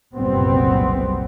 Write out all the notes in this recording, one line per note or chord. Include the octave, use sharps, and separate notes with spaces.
F#1 C2 A#2 G3 B3 C4